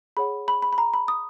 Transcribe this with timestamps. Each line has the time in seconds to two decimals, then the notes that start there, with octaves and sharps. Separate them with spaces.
0.17 G#4 C#5 F#5 B5
0.48 B5
0.62 B5
0.73 B5
0.78 A#5
0.94 B5
1.08 D#6